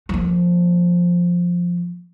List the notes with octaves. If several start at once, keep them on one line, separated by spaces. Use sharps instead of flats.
F3 A#3